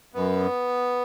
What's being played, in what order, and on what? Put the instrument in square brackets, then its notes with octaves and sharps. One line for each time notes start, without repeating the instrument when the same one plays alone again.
[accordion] F#2 B3